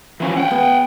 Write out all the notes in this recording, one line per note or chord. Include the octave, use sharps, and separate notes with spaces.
E3 F3 C#4
F#5 G5
B3